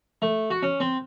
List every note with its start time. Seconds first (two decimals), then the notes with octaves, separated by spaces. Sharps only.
0.22 A3
0.50 F#4
0.63 C#4
0.80 C4